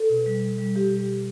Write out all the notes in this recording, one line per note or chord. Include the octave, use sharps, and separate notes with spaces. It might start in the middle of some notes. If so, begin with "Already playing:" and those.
Already playing: A4
B2
G3
B2
G3
B2 G4
G3
B2